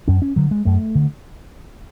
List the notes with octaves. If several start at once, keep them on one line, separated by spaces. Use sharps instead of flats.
F#2 C#4
C#4
D3 F#3
G#3
F#2 A3
D3